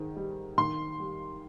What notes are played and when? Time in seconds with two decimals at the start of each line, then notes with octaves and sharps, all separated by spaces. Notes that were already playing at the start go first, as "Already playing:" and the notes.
Already playing: G#2 D#3
0.16 G3
0.58 D#3 C6
1.00 G3